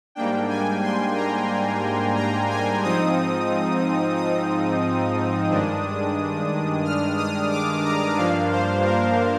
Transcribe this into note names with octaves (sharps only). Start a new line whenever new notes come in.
G#2 G3 A#3 D4 G5
G#5
C6
A#5
A#5
G#5
G#2 F3 C4 D#4 D#6
D#6
G2 D#3 G#3 D4
F6
D#6
D6
A#5
G2 F3 A#3 D4 F5
C5
A#4